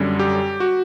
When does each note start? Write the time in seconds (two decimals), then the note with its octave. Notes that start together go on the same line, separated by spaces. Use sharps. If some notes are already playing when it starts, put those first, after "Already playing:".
Already playing: F#2 D3 G3 C#4
0.19 G4
0.60 F#4